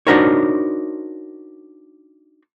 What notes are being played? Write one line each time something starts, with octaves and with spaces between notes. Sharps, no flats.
D4 D#4 F#4 A#4 C5 C#5